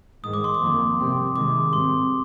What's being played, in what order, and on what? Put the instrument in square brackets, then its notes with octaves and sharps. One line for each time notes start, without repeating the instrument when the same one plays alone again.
[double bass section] G#2 D#3 G#3 [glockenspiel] D#6
[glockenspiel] D6
C6
D6
[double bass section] F2 D#3 A#3
C3 G3 C4
[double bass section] C3 D#3 G#3 [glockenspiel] D6
[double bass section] G#2 G3 C4 [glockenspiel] C6